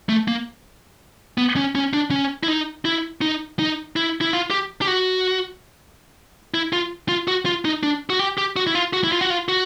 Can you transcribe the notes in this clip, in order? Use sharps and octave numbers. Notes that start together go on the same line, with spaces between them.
A3
A#3
B3
C#4
C#4
D4
C#4
E4
D#4
E4
D#4
D#4
E4
E4
F4
G4
G4
F#4
E4
F4
F4
F#4
F4
D#4
D4
F#4
G4
G4
F#4
E4
F4
F#4
E4
F4
F#4
F4
F#4